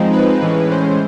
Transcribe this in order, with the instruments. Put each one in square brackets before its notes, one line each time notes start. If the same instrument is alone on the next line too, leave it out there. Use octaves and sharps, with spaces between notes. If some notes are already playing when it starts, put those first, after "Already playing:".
Already playing: [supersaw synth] F3 G#3 C4 D#4
B4
A2 E3 G#3 C#4
C5